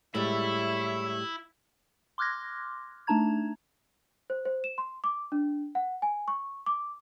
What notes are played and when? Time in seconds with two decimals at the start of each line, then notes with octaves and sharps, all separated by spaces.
0.15 A2 G3 G#3 E4 C#5 E5
2.18 C6 D6 F6 F#6 G#6 A#6
3.07 A3 D4 D#4 A5 A#5 G#6
4.30 C5
4.45 C5
4.64 E7
4.78 C6
5.04 D6
5.32 D4
5.75 F#5
6.02 G#5
6.28 C#6
6.66 D6